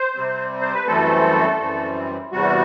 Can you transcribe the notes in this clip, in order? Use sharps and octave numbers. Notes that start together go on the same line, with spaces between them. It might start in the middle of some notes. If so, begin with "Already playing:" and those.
Already playing: C5
C3 G3 C4
C5
B4
F#2 E3 G3 A3 C4 A4
F#2 E3 G3 C4
E2 C3 G3 F#4